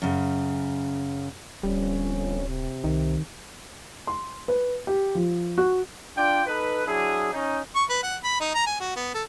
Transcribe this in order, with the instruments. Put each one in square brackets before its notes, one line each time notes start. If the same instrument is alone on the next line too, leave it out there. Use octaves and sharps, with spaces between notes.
[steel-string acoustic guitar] F#2 C#3
[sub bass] D1 [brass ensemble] G1 F2 C#4 [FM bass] G3
[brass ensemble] C3
[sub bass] C2 [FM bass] D#3
[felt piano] C6
B4
G4
F3
F#4
[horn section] D4 F4 D5 G5
D#4 A4 B4
F#3 D4 E4 G#4
C#4 D#4
[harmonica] C#6
B4
F#5
B5
D#4
A#5
G#5
F#4
B3
A4